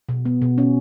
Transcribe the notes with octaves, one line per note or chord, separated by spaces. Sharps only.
B2
B3
B2
C#4